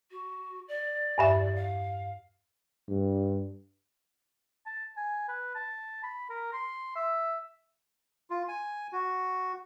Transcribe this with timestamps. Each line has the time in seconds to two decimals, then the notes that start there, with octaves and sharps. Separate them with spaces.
0.11 F#4
0.68 D5
1.18 E2 G2 E5
1.55 F5
2.89 G2
4.66 A5
4.97 G#5
5.29 B4
5.55 A5
6.03 B5
6.29 A#4
6.53 C6
6.96 E5
8.30 F4
8.48 G#5
8.93 F#4